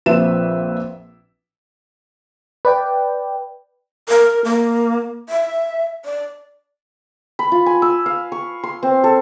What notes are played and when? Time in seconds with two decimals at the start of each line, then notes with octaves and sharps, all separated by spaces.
0.06 A#1 F3 C4 B4 E5 E7
2.65 B4 D5 G5
4.09 A#4
4.45 A#3
5.29 E5
6.05 D5
7.39 B5
7.52 F4
7.66 G#5
7.82 E6
8.06 F5
8.32 C#6
8.63 C6
8.83 C4
9.04 A4